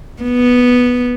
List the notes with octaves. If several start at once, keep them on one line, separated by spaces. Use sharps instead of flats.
B3